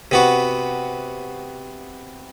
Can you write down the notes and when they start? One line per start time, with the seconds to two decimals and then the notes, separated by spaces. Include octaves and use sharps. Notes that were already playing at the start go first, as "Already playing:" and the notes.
0.11 C3 B3 F#4